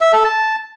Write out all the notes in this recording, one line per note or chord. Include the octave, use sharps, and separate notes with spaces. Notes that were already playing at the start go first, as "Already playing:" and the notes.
E5
A4
A5